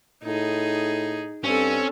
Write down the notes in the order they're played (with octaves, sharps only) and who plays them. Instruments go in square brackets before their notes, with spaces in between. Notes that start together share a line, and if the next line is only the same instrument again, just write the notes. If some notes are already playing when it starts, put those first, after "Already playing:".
[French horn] A2 [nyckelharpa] D#4 G#4
[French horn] G2 [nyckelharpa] C4 A4 [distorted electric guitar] C#4